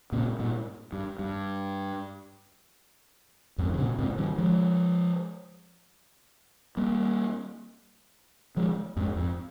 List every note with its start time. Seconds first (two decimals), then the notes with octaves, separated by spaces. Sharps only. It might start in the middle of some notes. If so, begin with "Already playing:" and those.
0.12 A#2 C#3
0.39 G2 A#2
0.93 G2
1.19 G2
3.58 F2 G#2
3.74 D#3
3.78 A#2 C#3
3.99 G#2 C3
4.18 D#3 G3
4.38 F3 G#3
6.77 G3 A#3
8.57 F3 G#3
8.96 F2 G#2
9.16 F2